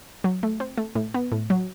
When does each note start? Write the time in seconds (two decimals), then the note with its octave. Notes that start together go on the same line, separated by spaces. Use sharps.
0.24 F#3
0.43 A3
0.60 C4
0.77 A3
0.95 A2
1.14 B3
1.32 A2
1.50 F#3